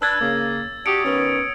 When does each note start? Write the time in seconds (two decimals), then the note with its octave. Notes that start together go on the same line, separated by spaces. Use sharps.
0.02 D4 B4 E6 G#6 A6
0.21 C#3 A#3
0.86 D4 F#4 G4 D#6 C#7 D7
1.05 D#3 B3 C#4